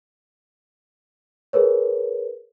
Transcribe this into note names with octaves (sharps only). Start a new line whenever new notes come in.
G#4 A#4 B4 C#5